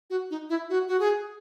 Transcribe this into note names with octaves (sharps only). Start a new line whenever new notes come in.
F#4
D#4
E4
F#4
F#4
G#4